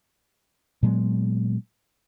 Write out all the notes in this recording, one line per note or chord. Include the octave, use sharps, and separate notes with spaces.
A#2 F#3 G#3 B3